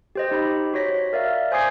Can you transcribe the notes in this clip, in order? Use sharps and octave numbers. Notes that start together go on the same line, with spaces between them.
G4 C5 D#5
D#4 G4 B5
F#4 C5 C#5 A#6 B6
A#4 D5 E5 F5
C5 G#5 D6 D#6 G#6 C7